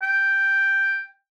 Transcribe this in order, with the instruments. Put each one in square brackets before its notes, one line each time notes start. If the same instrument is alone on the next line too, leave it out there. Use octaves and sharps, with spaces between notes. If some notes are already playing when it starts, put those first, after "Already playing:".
[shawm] G5